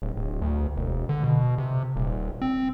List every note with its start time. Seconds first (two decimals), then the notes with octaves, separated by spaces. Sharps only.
0.02 D1
0.16 D1
0.42 D2
0.76 E1
1.09 D3
1.24 B2
1.58 C3
1.96 D#1
2.42 C4